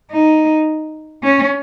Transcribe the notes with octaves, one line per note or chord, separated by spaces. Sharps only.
D#4
C#4